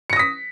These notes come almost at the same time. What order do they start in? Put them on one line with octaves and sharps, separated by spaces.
C#7 A#6 D#6 B6